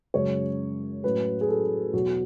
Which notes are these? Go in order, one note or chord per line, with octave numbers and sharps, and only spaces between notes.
F#2 C#3 G#3 C#5
A2 F#3 C#4 B4
G#4
A4
E2 B2 F#3 F#4